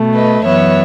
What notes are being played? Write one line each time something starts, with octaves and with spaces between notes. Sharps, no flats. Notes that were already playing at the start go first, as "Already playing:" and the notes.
Already playing: B2 A3
B4 D#5
F#2 E3 B3 C#5 E5